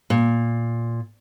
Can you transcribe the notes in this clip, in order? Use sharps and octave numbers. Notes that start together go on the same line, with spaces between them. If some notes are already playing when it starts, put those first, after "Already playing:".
A#2